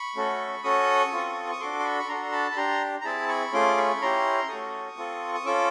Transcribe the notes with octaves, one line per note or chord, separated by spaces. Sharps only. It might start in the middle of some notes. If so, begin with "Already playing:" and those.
Already playing: B5 C#6
A3 C#4 F#4 A4
C#4 F#4 A4 C#6 D#6
C4 F4 A4
D#6
D4 F#4 A4 C6 D6
C6
B5 C#6
C#6
D4 F#4 A4 A#5 C6
A5 B5
B5
D4 G4 A#5 C6
A#5
C4 E4 G#4 A5 B5
B5 C#6
A3 C#4 F4 G#4 C6 D6
B5 C#6
C#4 E4 G4 A#5 C6
A3 C#4 F#4 A4 C#6 D#6
C4 F4 A4
D#6
C#4 F4 A4 D6 E6